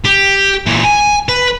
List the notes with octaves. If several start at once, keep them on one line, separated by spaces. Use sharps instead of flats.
G4
A#2 E3
G#5
B4